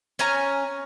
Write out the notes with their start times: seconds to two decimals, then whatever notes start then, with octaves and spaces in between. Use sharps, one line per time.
0.19 C#4 C#5 G#5 A#5